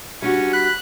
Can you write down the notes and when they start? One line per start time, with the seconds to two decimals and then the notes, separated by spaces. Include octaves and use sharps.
0.22 G3 C#4 D4 F#4
0.53 B5 F#6